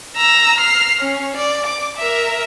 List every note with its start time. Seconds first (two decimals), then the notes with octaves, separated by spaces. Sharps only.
0.16 A#5 E6
0.58 F6 C7
1.01 C#4
1.36 D5
1.66 D6
1.97 A#4 E5